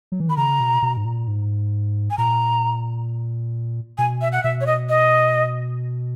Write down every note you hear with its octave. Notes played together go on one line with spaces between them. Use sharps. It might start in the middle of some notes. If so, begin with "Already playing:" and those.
F#3
E3
D#3 B5
C#3 A#5
B2
B2
G#2
A#2
G#2
G#5
A#2 A#5
B2 G#5
E5
F#5
B2 E5
C#5
D#5
D#5